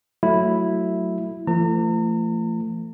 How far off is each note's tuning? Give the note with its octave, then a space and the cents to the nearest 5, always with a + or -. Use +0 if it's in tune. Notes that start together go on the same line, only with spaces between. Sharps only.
F#3 +0 A3 +0 E4 +0
F3 -45 A3 +25 A#5 -40